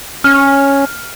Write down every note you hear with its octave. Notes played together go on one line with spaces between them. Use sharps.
C#4 F6